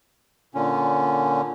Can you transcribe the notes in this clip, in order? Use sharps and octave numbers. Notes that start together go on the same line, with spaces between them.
A#2 D3 C#4